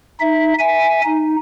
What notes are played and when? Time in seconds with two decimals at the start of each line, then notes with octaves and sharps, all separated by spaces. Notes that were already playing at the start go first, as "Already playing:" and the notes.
0.20 D#4 E5
0.59 E5 G#5
1.05 D#4